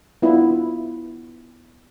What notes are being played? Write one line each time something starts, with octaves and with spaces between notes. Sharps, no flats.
B3 D4 E4 F4 B4